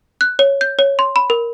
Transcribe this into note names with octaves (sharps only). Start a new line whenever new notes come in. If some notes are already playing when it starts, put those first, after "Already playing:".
F#6
C#5
G6
C#5
C6
B5
A#4